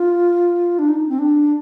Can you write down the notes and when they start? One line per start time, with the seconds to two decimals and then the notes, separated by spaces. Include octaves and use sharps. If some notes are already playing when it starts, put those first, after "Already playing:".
Already playing: F4
0.79 D4
0.89 D#4
1.09 C4
1.19 D4